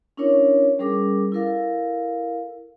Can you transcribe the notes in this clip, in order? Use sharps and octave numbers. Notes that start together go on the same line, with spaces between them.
C#4 D4 E4 A#4 C#5
G3 C#4 G#4 A#4 D6
E4 A4 A#4 F5